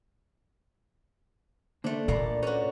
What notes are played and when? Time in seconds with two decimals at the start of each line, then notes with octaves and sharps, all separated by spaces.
1.84 D3 A3 A#3 D4 C5
2.08 A#2 A3 A#3 A4 D5 B5
2.43 C#4 F#4 B4 C5